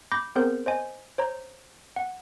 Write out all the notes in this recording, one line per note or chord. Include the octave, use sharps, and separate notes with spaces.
B5 D6 G6 A#6
B3 C4 G#4 A#4 C5 G6
C5 D#5 G#5
C5 C#5 A#5
F#5